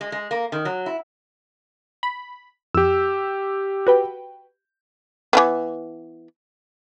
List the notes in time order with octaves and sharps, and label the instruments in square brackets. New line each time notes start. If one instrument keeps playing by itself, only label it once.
[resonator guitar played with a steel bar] G#3
G#3
A#3
D#3
F#3
E4
[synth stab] B5
[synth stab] F2 [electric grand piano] G4 E6
[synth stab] F#4 B4 G5
[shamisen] E3 F#3 B3